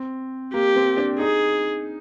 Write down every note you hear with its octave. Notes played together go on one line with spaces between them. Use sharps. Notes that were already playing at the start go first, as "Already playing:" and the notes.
Already playing: C4
A#3 G4
C4
D4
D#4 G#4